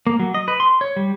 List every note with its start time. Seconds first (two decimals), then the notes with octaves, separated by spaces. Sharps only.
0.07 A#3
0.19 F#3
0.34 D#5
0.48 B4
0.60 C6
0.81 C#5
0.96 G3